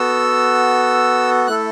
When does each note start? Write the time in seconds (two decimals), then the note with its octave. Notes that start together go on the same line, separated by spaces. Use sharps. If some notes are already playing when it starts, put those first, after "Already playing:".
Already playing: B3 F#4 A4 E6
1.47 A3 E4 A4 F#6